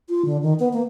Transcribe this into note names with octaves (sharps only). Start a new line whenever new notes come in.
F4
D3
D#3
B3
A#3